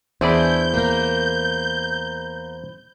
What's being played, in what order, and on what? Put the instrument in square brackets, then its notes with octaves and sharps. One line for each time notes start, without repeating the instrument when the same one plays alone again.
[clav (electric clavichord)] E2 G#4 D5 [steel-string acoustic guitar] D4 E4 [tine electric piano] C5 B5 [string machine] G6
[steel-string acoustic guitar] A#3 A#4